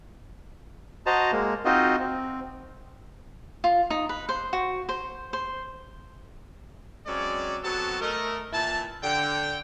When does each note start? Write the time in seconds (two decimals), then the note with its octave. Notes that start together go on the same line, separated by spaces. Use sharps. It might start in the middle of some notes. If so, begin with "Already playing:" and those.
1.06 F#4 C5 D#5 A5 A#5
1.32 G#3 A#3
1.65 C4 D#4 F4 F#4 C5 D#5
1.99 C4
3.64 F4
3.90 D#4
4.09 B4
4.29 C5
4.53 F#4
4.89 C5
5.33 C5
7.07 F#3 G#3 C4 C#4 D5
7.63 F#3 B3 C4 F#4 A4 A5
8.01 A3 A#4 D#5
8.53 A#2 E3 E4 A5
9.03 D3 G5